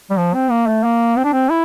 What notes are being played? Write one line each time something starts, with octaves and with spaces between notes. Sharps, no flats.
G3
F3
C4
A#3
A3
A#3
C4
D4
C4
E4